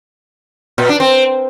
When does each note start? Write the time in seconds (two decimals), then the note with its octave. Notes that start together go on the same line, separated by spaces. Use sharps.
0.78 A#2
0.89 D4
1.00 C4